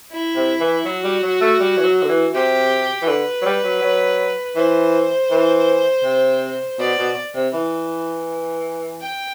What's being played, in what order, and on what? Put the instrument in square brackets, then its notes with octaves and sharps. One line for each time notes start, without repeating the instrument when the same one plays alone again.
[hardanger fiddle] E4
[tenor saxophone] C3
E3
[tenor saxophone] F#3 [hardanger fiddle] F#4
[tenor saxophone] G3
F#3
A3
G3
E3
F#3
D3
E3
[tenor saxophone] C3 [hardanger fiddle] G4
[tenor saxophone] E3
[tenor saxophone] D3 [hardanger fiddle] B4
[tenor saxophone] F#3
G3
F#3
F#3
[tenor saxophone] E3 [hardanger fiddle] C5
[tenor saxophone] E3
C3
[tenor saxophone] B2 [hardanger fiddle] D5
[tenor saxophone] B2
C3
E3
[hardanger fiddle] G5